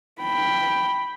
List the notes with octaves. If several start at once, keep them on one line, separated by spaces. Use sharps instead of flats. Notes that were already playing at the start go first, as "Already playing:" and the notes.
G5 B5